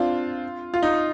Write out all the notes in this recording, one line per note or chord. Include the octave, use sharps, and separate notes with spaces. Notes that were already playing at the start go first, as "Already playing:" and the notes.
Already playing: C4 D4 F4
F4
D#4